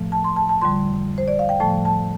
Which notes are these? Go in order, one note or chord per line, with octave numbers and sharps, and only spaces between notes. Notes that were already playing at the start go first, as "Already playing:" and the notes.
Already playing: A2 F3 A3
A5
C6
A5
A5
F2 D3 G3 C6
C5
D5
F5
G5
A2 F3 A3 A5
A5